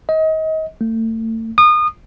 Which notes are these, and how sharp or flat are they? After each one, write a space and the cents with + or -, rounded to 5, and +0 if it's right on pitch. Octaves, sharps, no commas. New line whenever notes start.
D#5 +30
A3 +35
D#6 -30